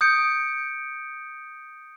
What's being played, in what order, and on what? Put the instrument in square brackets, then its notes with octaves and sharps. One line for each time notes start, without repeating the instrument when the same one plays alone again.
[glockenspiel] D#6 G6 C#7 D7